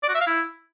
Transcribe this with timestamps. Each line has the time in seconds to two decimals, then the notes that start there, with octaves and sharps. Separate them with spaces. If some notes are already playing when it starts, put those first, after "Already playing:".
0.03 D5
0.09 F#4
0.15 E5
0.21 F5
0.27 E4